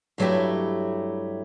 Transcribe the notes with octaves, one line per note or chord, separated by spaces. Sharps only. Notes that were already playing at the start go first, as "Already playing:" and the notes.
G2 F#3 A3 E4 G4